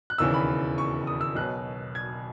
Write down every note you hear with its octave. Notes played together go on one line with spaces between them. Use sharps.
F#6
E1 D#2 C#3 E3 E6
B5
C#6
D#6
E6
B1 B2 F#3 F#6
G#6